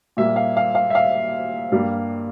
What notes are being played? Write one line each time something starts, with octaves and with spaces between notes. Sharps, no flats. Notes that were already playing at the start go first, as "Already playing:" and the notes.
A#2 G3 A#3 E5
F5
F5
F5
E5
F5
G2 G3 A#3